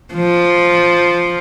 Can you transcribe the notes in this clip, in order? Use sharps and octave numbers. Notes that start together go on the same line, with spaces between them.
F3